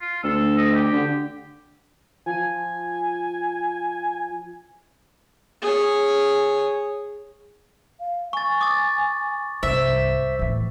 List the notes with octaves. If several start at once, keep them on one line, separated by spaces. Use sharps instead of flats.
F4
D2 A4
D#5
G4
D3
F3 G#5
G#4 C#5
F5
G#5 C#6 A6
D6 D#6 A6
C2 G2 C5 E5
A2 E3